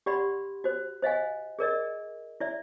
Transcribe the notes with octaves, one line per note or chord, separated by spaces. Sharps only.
G4 D5 F#5 B5 C6
F#4 C5
C5 D#5 F5 G#5
G#4 A#4 D5 D#5
E4 D5 E5